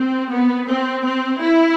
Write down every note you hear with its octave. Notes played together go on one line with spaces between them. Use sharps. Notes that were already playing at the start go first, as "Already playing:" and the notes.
Already playing: C4
B3
C4
C4
E4